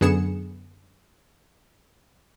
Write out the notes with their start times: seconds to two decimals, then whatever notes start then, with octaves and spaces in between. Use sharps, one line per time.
0.01 F#2 D3 B3 G#4 C#7 E7